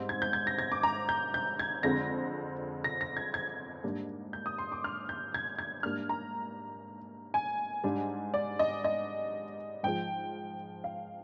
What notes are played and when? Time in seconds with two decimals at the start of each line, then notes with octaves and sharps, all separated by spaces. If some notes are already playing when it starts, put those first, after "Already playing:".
Already playing: G#2 G3 C4
0.09 G#6
0.22 G6
0.33 G#6
0.47 A#6
0.58 G#6
0.72 D6
0.83 A#5
1.09 G6
1.34 G6
1.59 G#6
1.83 F2 D3 G#3 C4 A#6
2.84 A#6
3.01 A#6
3.17 G#6
3.34 G#6
3.84 G#2 G3 A#3 D4
4.33 G6
4.46 D#6
4.58 C6
4.72 D6
4.84 F6
5.09 G6
5.34 G#6
5.59 G#6
5.83 G#2 G3 A#3 D4 F6
6.09 A#5
7.34 G#5
7.83 G#2 G3 D4
8.34 D5
8.59 D#5
8.84 D#5
9.83 G#2 F3 G#3 G5
10.84 F5